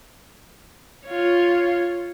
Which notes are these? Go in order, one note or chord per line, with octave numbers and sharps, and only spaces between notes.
F4 C#5